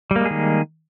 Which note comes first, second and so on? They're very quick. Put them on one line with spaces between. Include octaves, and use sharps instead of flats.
G3 A#3 G#3 G#4 D#3